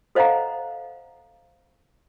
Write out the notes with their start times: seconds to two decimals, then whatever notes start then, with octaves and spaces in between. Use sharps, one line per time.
0.15 A4 C5 D#5 F5 F#5 A#5